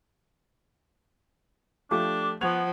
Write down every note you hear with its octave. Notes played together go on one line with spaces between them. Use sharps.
F3 A3 D4 G4 D6
F3 B3 F#5 C#6 G#6 F7